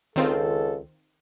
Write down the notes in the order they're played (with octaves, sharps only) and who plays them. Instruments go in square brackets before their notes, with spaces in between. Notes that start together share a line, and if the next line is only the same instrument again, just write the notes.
[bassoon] C#2 [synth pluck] D#3 C4 F4 [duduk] A4